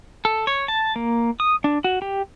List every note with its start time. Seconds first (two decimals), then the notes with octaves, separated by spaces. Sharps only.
0.25 A4
0.47 C#5
0.68 A5
0.96 A#3
1.40 D#6
1.64 D4
1.84 F#4
2.02 G4